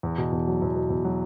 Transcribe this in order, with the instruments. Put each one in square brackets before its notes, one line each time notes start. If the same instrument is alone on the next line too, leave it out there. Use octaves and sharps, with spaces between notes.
[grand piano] E2
B2
E2
F#3
E2
B2
E2
F#3